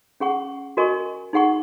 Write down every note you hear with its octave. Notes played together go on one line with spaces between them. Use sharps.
C#4 G#4 F#5 C#6
F#4 A#4 D#5 G#5 C#6
D#4 G#4 F#5 C#6